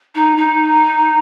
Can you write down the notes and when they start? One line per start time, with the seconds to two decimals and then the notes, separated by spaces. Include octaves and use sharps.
0.15 D#4
0.37 D#4